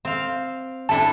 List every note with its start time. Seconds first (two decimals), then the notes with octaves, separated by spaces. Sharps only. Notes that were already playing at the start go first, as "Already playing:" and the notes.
0.05 C4 F5
0.89 D4 E4 A4 A5